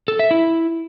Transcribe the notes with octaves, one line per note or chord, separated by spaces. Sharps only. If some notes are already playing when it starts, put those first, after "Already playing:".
A4
E5
E4